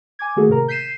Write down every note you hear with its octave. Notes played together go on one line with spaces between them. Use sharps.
G#5 D6 G#6
D#3 A3 A#3 F#4 G#4 A4
A2 C3 A#4 A#5
G6 B6 C7 D#7 E7